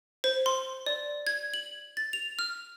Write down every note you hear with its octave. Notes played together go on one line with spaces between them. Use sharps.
C5
C6
D5
G#6
F#7
A6
F7
F6